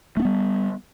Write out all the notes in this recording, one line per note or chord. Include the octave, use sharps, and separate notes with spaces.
G3 A3 B3 D4